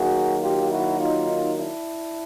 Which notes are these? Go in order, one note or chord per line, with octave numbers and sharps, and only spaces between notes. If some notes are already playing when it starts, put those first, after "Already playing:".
Already playing: D#3 F#3 A#3 F#4 G#4
F4 G4
E4 F#4
D#4 F4
D4 E4